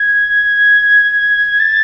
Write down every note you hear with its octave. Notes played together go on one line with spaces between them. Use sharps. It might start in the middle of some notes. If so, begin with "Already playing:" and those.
Already playing: G#6
A6